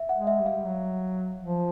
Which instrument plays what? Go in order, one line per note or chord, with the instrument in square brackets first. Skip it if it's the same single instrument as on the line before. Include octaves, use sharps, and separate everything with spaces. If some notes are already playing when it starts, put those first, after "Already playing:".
Already playing: [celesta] E5
F#5
[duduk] G#3
[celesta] E5
[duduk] G3
[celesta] F5
[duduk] F#3
F3